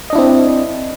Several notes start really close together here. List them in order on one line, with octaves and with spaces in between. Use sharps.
D#5 D4 E4 C4